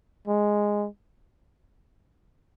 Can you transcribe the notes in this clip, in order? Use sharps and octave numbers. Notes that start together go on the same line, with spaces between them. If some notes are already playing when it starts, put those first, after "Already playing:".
G#3